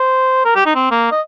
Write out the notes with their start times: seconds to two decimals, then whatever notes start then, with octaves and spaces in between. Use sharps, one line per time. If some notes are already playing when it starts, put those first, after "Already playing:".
Already playing: C5
0.45 A#4
0.55 G4
0.66 D#4
0.75 C4
0.91 A#3
1.12 D#5